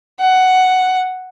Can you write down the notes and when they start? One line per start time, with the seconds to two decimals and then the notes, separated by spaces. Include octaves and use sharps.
0.20 F#5